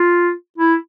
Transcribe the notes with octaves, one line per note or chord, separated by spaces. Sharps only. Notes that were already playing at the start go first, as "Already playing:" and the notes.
Already playing: F4
E4